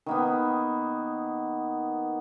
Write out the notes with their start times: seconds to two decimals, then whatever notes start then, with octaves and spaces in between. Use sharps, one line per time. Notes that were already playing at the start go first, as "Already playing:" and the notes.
0.06 D#3 A#3 B3